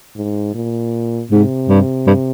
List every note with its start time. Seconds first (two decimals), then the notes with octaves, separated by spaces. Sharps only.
0.16 G#2
0.54 A#2
1.31 G#2 C3
1.68 G2
2.07 G2